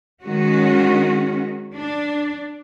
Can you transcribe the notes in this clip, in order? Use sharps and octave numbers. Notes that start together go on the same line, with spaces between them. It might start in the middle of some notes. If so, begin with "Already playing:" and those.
D#3 G#3 C#4 F#4
D4